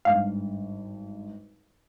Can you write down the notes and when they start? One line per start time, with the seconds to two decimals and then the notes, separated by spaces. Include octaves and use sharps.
0.05 G#1 G2 F5